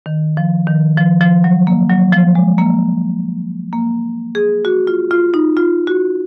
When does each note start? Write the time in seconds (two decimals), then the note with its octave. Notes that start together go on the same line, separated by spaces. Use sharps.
0.06 D#3
0.37 F3
0.67 D#3
0.97 F3
1.21 F3
1.44 F#3
1.67 A#3
1.90 F#3
2.13 F3
2.35 G#3
2.58 A#3
3.73 A#3
4.35 G#4
4.65 F#4
4.87 F4
5.11 F4
5.34 D#4
5.57 F4
5.87 F#4